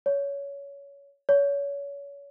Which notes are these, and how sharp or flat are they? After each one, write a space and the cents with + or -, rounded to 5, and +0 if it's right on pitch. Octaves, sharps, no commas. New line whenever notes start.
C#5 +20
C#5 +30